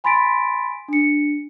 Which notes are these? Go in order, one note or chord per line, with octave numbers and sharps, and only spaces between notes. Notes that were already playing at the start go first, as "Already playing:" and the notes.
G#5 B5 C6 A6 B6 D7
D4 C#7